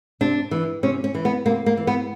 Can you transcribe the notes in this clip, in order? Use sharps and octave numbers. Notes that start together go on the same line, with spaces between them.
C3 D4
E3
C3 C#4
C#4
E3
B3
C3 A#3
A#3
E3
B3